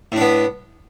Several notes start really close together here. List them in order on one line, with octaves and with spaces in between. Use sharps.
A2 D4 B3